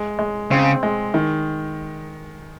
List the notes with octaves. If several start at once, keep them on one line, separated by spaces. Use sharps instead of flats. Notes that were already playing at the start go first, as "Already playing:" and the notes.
Already playing: G#3
G#3
C#3 C4
G#3
D#3